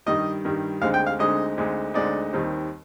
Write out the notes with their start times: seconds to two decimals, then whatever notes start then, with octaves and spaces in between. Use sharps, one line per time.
0.06 G2 D#3 G3 D#5
0.45 G2 D#3 G3
0.81 D2 D3 G#3 C4 D#4 F5
0.94 G5
1.06 F5
1.19 D2 D3 G#3 C4 D#4 D#5
1.58 D2 D3 G#3 C4 D#4
1.94 D2 D3 G#3 C4 D#4 D5
2.33 D#2 D#3 G3 C4